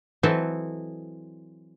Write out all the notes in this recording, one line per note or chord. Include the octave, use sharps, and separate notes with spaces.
E3 F#3 C4 E4 A4 D#5